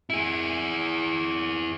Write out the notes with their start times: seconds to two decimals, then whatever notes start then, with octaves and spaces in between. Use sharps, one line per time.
0.10 E4 G#4